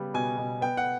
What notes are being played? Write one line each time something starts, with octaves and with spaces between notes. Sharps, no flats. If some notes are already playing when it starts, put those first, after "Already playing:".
Already playing: C#3 G3 B3
B2 G#5
B2
B3 G5
F#5